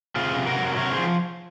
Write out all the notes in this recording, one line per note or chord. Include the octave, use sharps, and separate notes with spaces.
C3 F4 G#4
C3
F#4 A#4
F#3
C3 A#4 C#5
G#4 C5
F3